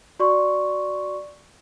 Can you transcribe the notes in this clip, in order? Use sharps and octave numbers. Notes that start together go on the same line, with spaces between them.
F#4 D5 C6 C#6